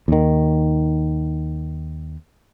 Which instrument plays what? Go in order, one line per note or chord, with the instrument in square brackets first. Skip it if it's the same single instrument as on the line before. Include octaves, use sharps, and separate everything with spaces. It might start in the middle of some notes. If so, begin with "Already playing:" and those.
[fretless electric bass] D#2 D#3